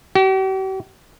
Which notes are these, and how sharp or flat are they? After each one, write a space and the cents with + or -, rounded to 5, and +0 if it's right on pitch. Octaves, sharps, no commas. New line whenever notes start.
G4 -45